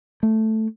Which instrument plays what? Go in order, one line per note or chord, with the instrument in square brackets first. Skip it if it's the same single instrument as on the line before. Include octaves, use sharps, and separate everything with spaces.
[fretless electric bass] A3